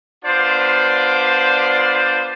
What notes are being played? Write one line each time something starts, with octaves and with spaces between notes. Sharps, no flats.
B3 D4 F4 C5 D5